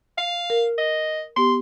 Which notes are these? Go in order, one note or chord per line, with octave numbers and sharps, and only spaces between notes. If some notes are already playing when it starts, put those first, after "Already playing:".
F5
A#4
D#5
B3 G4 C6